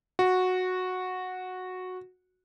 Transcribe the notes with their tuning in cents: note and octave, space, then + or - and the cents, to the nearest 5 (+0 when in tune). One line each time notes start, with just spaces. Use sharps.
F#4 -10